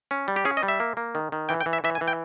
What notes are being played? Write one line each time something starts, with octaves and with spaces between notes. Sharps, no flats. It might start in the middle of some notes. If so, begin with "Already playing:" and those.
C#4
G3
G4
C#4 G#4
D#5
G3
E5
A#3
A#3
D#3
D#3
E3 G5
G5
E3
E5
E3 E5
G#5
E3
G5